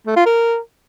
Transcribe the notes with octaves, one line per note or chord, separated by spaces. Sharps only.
A3
F4
A#4